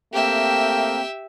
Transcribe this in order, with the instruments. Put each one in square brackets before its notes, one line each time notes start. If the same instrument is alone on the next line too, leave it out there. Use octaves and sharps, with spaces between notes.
[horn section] A3 A#3 C4 [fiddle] G4 E5